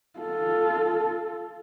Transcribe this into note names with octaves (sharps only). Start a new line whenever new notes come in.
F4 A4